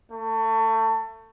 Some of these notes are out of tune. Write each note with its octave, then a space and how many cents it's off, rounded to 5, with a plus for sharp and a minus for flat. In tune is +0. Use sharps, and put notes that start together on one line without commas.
A3 +25